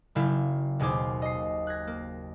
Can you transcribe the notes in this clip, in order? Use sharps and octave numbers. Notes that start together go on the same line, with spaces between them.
F#1 C#3 E4 F5 G6
D#2 B2 G#4 C5 D6
D#5 C7
F#6 G#6 A#6
A#3